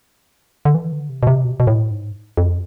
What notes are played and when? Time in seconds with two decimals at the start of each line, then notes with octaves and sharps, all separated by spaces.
0.65 D3
0.75 E3
0.92 D3
1.10 C3
1.23 B2
1.27 C3
1.45 B2
1.52 C3
1.60 B2
1.67 A2
1.91 G#2
2.37 F2